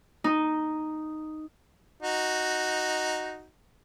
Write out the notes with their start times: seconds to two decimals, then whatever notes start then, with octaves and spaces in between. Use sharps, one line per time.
0.24 D#4
2.03 D#4 F#4